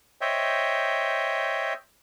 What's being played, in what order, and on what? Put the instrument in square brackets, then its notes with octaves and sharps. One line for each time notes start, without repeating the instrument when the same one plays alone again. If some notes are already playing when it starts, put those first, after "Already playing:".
[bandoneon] C5 C#5 D#5 E5 G5